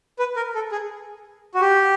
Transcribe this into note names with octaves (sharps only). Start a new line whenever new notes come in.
B4
A#4
A4
G#4
F#4
G4